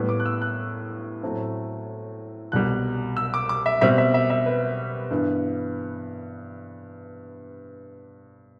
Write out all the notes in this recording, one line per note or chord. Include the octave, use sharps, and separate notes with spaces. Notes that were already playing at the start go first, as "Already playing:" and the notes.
Already playing: A2 G3 B3
D6
F#6
E6
F#6
A2 F#3 A3 C4
C2 B2 G3 F#6
E6
D6
D6
E5
B2 G3 C4 E5
E5
E5
E5
B4
G2 E3 B3